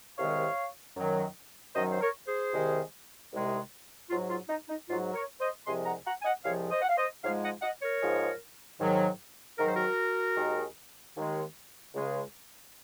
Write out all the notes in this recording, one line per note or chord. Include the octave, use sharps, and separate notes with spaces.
C2 C3 D#3 G#3 C#5 F5
F#2 D#3 F#3
F#2 D#3 F#3 C5 D#5
C5
A#4 C#5
G#4 C5
C2 C3 D#3 G#3
C2 C3 D#3 G#3
G#2 F#3 F4
F4
D#4
D#4
G#2 F#3 F4
A#4 C#5
C5 D#5
C2 C3 F3 G#3 G#5 C6
F#5 A#5
F#5 A#5
G#5
D#5 F#5
C2 C3 F3 G#3 C#5 F5
C5 D#5
F#5
F5
C5 D#5
G#2 F3 G#3 C#5 F5
D#5 F#5
D#5 F#5
A#4 C#5
G#2 F3 G#3
G#2 D#3 F#3
G#2 D#3 F#3 A#4
C5
F#4 A#4
D#2 D#3 G#3
D#2 D#3 G#3
C#2 C#3 G#3